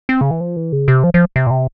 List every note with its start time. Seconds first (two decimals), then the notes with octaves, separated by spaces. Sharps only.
0.09 C4
0.21 C#3
0.31 E3
0.41 F3
0.57 E3
0.72 C#3
0.88 C3
1.04 F3
1.14 F3
1.36 C3
1.47 A#2
1.51 C3